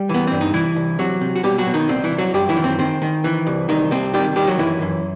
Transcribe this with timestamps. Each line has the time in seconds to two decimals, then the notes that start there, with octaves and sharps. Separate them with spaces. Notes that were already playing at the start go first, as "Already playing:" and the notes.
Already playing: G3 G4
0.09 E3 B3
0.27 G2 C4
0.41 D#4
0.54 C2 E3 E4
0.76 C2
0.99 C3 F#3 F#4
1.21 C3
1.36 F#4
1.43 B2 G3 G4
1.58 F#3 F#4
1.67 B2
1.74 D#3 D#4
1.89 C2 C4
2.04 E3 E4
2.11 C2
2.18 F#3 F#4
2.34 F#2 G3 G4
2.49 E3 E4
2.56 D#3
2.64 C4
2.79 D#3 C4
3.02 D#3
3.24 E3
3.46 C2
3.69 C2 D#3 D#4
3.91 C3 C4
4.14 D#3 G3 G4
4.36 D#3 G3 G4
4.47 F#3 F#4
4.58 F#2 E3 E4
4.81 F#2